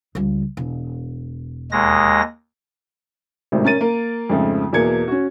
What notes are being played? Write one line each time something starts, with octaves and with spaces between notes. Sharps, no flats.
C#2 G3
E1
D#2 G#3 A#6
G#1 A2 C3 D#3 C5
C#4 A#4 A6 D#7
A#3 A#4
F2 G#2 C#3 F3 A3
E2 B2 A#3 G#6 C#7
C#4 F#4